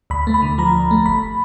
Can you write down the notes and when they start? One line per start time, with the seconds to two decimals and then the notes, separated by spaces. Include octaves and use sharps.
0.10 D2 B5
0.27 A3
0.34 B5
0.42 D3
0.58 F3 A#5
0.75 D2
0.91 A3
1.06 G1 B5